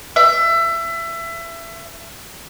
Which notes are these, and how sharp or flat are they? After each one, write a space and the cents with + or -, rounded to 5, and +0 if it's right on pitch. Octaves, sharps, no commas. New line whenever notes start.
E5 +25